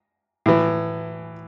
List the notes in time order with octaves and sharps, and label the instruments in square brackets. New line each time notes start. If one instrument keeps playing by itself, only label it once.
[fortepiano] A2 E3